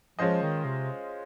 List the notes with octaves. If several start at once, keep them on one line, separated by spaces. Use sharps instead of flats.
F3 G#3 C#4 F4 C5 D#5
D#3
C3